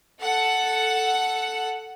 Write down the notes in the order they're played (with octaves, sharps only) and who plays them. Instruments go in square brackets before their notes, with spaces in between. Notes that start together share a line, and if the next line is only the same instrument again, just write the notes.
[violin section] A4 F#5